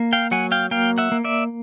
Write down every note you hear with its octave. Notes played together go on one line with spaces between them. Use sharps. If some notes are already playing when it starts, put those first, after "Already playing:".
Already playing: A#3
F5 G5
F#3 F#5 G#5
F5 G5
A#3 F5 G5
E5 F#5
A#3
D5 E5